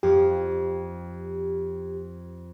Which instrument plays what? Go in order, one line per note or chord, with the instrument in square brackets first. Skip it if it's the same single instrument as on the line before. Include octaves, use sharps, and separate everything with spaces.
[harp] F2 [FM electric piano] G4